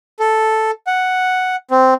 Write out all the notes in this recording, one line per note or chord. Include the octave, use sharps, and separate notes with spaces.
A4
F#5
C4